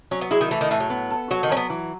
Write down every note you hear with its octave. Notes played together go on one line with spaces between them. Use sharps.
F#3 C#4
B3
G#3 E4
D#3
E3 A3
D#3
A2 E3
F#3
B3
A4
F#3 F#4
D#3
F#3 C#4
B3
E3